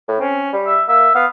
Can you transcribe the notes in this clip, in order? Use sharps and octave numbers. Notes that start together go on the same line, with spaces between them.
A2
C4 C#4
G3
E5
A#3 E5
B3 F5